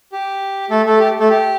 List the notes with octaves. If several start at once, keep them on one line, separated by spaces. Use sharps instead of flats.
G4
A3 A4
A3 A4
G4
A3 A4
G4